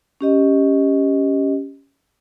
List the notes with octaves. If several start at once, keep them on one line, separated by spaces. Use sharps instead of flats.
C#4 G4 D#5